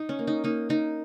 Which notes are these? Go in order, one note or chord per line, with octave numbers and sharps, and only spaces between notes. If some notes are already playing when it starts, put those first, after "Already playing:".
Already playing: D#4
C#4
A#3
D#4
A#3 D#4
A#3 D#4